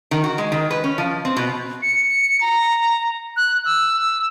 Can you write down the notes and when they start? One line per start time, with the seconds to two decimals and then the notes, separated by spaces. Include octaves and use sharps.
0.11 D#3
0.24 F#4
0.38 G#3
0.52 D#3
0.71 B4
0.84 C#4
0.98 F3
1.25 C4
1.37 B2
1.82 C#7
2.41 A#5
3.37 F#6
3.65 E6